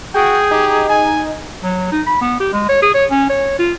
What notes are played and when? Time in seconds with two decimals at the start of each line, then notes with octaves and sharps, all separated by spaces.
0.14 F#4 G#4 G5
0.51 D#4 G4
0.90 G#5
1.63 F#3
1.92 D#4
2.07 B5
2.21 B3
2.40 G4
2.53 G#3
2.69 C#5
2.82 G#4
2.94 C#5
3.11 C#4
3.30 C#5
3.59 F4